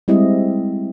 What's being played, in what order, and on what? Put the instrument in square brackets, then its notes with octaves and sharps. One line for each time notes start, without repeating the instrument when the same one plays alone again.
[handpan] G3 G#3 C4 E4 G4 D#5